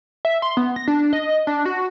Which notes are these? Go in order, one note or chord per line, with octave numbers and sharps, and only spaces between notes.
E5
C6
B3
A#6
D4
D#5
D4
F#4